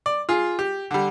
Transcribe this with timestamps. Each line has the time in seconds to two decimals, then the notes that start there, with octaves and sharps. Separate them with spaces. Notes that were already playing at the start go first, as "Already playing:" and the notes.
0.06 D5
0.29 F4 G#4
0.59 G4
0.91 D3 G3